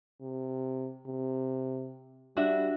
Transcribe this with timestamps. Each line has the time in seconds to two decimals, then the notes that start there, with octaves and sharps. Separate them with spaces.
0.21 C3
1.07 C3
2.37 G3 D4 F#4 E5